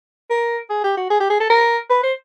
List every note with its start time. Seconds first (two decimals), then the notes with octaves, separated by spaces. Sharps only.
0.30 A#4
0.70 G#4
0.84 G4
0.97 F#4
1.10 G#4
1.20 G4
1.30 G#4
1.40 A4
1.50 A#4
1.90 B4
2.03 C5